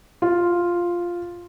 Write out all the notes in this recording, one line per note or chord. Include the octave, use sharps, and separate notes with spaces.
F4